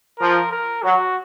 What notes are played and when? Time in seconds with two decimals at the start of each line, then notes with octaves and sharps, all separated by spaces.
0.19 F3 A#4
0.51 A#4
0.83 F#3 F#4